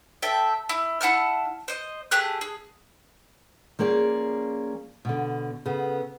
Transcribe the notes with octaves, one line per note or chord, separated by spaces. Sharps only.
A4 E5 G5
E4
E4 F#5 A5 F6
C5 D#5
A3 G4 G#4 F#6
G#4
F3 A#3 C#4 G#4 D5
B2 D3
C#3 B3 A4